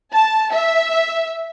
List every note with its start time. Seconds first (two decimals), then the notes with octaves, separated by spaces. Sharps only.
0.13 A5
0.54 E5